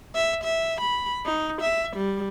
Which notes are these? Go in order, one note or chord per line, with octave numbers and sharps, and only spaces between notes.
E5
E5
B5
D#4
E5
G3